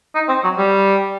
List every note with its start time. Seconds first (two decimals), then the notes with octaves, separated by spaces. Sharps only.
0.15 D#4
0.28 C4
0.43 F#3
0.58 G3